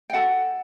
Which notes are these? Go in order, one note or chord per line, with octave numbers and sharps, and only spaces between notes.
G5
F#4 A4 F#5 A5